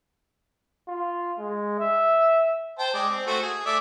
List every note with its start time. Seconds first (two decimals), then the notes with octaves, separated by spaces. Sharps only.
0.88 F4
1.39 G#3
1.79 E5
2.79 C5 G5 A5
2.94 G#3 D5
3.10 C4
3.27 A3 F#4 C5
3.42 G#4
3.66 A3 D5 E5